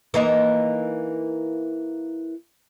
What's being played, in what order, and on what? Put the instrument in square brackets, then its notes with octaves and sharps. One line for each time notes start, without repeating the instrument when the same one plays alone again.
[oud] E3 A#3 D#4